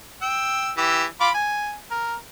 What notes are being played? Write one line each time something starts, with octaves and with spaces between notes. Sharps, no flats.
G5 E6
E3 G4 E6
F4 B5 D6
G#5
A#4